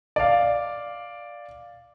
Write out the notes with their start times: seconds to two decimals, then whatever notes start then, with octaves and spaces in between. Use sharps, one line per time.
0.16 D5 F5